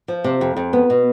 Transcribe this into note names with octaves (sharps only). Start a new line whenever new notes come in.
F3
C3
F2
F2
B3
B2